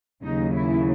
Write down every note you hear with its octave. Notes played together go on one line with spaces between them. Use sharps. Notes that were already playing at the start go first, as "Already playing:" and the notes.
D#2 C#3 F#3 D#4
E4